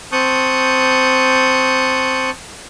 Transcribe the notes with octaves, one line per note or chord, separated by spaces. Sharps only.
C4 A5 C#6 D#6 F#6 G6